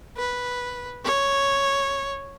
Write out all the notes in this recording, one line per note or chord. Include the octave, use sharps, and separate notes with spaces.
B4
C#5